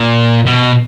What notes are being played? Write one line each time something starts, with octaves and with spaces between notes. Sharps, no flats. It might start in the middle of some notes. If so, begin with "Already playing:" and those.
Already playing: A#2
B2